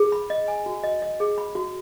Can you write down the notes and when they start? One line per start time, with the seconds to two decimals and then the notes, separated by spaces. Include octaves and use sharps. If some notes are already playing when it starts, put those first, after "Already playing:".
Already playing: G#4
0.12 B5
0.30 D#5
0.48 G#5
0.66 F#4
0.84 D#5
1.02 D#5
1.20 G#4
1.38 B5
1.55 F#4